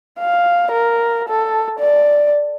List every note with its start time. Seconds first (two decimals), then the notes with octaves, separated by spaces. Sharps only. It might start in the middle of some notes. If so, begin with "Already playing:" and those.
0.19 F5
0.71 A#4
1.28 A4
1.79 D5